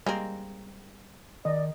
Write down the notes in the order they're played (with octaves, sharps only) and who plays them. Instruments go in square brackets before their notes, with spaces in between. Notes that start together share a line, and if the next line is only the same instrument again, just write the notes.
[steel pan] G3 A#5 [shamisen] G#3 A#3 C4
[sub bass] D#3 [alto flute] D5 [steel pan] D#5